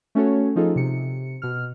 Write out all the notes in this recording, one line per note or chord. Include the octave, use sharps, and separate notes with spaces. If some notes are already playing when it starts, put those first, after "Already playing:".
A3 C#4 F#4 A4 C#5
F3 D#4 F4 G#4 A4
C3 C#7
B2 F6